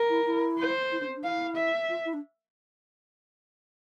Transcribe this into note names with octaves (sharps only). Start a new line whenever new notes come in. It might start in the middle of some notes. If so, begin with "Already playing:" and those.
Already playing: A#4
E4
E4
C5
E4
D4
C4
D4
E4 F5
E5
F4
E4
D4